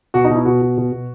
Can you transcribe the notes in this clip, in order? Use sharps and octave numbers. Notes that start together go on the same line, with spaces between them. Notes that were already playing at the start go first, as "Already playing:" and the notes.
B2 F#4
D#4
B2
E4
B2 F#4
B2
B2
B2